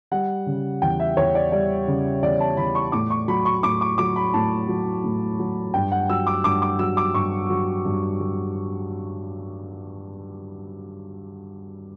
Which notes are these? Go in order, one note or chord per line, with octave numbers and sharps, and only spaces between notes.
G3 F#5
C#3
E2 G5
E5
E2 C#5
D5
G3 D5
C#3
E2 D5
A5
E2 B5
C#6
A2 D6
C#6
F#3 B5
C#6
A2 D6
D6
F#3 D6
B5
A2 A5
F#3
A2
F#3
G2 G5
F#5
F#3 E6
D6
G2 D6
D6
F#3 E6
D6
G2 C#6
F#3
G2
F#3